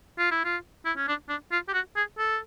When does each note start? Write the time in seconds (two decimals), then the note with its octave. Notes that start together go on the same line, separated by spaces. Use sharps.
0.18 F4
0.31 E4
0.44 F4
0.85 E4
0.97 C#4
1.07 D4
1.29 D4
1.52 F4
1.68 G4
1.73 F#4
1.96 G#4
2.18 A4